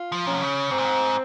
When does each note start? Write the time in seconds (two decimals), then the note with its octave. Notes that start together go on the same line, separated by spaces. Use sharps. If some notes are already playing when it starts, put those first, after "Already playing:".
Already playing: F4
0.12 F3
0.26 A#2 C#4
0.34 C3
0.41 C#3
0.71 G#2 C4
0.78 A#2
0.85 G#2